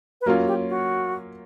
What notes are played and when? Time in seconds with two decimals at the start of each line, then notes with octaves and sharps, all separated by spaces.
0.21 B4
0.26 F#3 A#3 C#4 F4 A#4
0.47 G4
0.69 F#4